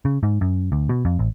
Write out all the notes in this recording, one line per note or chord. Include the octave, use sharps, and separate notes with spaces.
C#3
G#2
F#2
D2
B2
F2
A1